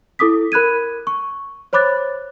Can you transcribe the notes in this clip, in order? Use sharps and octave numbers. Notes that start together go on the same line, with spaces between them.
E4 A4 D6 D#6 B6
A#4 B5 F#6 G#6 D#7
C#6
C5 C#5 B5 D6 F#6 A6